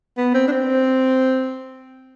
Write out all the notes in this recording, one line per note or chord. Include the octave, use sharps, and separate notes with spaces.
B3
C4
D4
C4